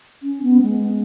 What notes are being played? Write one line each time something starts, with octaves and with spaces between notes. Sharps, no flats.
C#4
B3
G#3